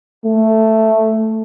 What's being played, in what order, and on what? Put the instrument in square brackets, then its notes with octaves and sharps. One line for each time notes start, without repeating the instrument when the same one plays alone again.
[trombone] A3